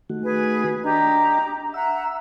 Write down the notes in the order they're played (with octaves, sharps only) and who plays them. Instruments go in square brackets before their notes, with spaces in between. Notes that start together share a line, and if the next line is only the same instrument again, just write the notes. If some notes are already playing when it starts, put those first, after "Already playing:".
[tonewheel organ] D#3 A3 F#4
[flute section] G#4 B4 G#5
[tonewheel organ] D4 [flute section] G4 D#5 A#5
[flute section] E5 F#5 A#5 [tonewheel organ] E6